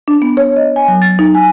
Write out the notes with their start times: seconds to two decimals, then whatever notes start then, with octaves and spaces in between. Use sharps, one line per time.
0.08 D4
0.22 B3
0.37 C#5
0.56 D#5
0.76 G#5
0.88 F#3
1.02 A6
1.19 D#4
1.35 G#5